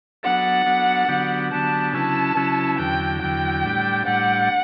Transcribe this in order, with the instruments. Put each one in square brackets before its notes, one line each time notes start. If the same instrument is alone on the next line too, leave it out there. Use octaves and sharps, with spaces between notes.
[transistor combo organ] F#3 B3 D4 A4 [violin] F#5
[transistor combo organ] F#3 B3 D4 A4
D3 F#3 B3 D4 G4
[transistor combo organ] D3 F#3 B3 D4 G4 [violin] A5
[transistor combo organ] C#3 F#3 C#4 E4 B4 [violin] A5
[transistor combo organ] C#3 F#3 C#4 E4 B4
[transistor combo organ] E2 D3 F#3 [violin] G5
[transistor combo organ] E2 D3 F#3 [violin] G5
[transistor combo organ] A2 G3 D4 G4
[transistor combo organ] A2 G3 D4 G4 [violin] F#5